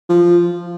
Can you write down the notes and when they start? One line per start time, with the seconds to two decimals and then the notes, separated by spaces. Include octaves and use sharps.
0.09 F3